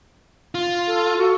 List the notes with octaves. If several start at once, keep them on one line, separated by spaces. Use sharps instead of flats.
F4
A4
F#4